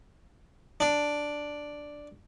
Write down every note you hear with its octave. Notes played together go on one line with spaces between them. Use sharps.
D4